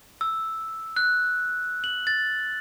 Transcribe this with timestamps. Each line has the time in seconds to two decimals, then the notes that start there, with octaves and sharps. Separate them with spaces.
0.21 E6
0.96 F#6
1.84 F#7
2.07 A6